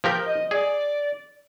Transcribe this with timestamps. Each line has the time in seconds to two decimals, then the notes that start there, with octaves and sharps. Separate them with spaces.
0.04 F3 G4 A#4 G6
0.25 D#5
0.51 G#4 D5